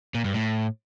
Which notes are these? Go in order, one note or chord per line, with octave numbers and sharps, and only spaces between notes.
A#2
G2
A2